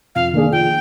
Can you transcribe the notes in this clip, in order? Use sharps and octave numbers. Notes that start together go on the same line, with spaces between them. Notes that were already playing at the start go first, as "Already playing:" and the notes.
F2 F5
D#3 A#3 D4 G#4
F3 G5